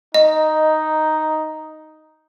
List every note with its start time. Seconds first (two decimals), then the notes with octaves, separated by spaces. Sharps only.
0.14 D#4 D#5